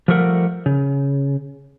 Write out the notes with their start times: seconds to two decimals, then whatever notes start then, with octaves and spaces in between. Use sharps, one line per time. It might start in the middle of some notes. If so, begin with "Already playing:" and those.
0.08 F3 G3 A3 A#4 F#5
0.66 C#3